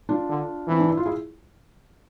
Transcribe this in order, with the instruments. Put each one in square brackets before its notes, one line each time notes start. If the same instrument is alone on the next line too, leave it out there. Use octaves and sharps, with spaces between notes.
[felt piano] D4 F4
[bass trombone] D3
[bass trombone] E3 [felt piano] C4
[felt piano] D4
E4
F4
E4 G#4